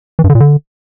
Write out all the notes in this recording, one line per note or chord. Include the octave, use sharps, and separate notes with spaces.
E3
G2
D3
A#2
D3